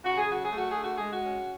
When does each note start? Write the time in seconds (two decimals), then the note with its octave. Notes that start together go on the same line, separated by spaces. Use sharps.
0.04 C#3 F#4
0.17 G#4
0.28 F#3 F#4
0.44 G#4
0.52 A3
0.57 F#4
0.70 G#4
0.75 D3
0.83 F#4
0.97 G#3 G#4
1.10 F#4
1.24 C#4